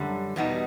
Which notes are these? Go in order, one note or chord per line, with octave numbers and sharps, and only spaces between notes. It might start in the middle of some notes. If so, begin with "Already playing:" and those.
Already playing: F#2 D3 G3
E2 B2 G3 B3 D#4